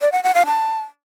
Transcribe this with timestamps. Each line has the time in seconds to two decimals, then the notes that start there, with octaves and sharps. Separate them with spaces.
0.01 D5
0.12 F#5
0.23 F#5
0.35 F5
0.46 A5